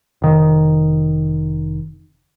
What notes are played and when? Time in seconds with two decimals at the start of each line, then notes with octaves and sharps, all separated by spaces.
0.22 F1 D#3